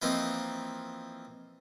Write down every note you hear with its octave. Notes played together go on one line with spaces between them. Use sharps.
E3 F3 A#3 C4 D#4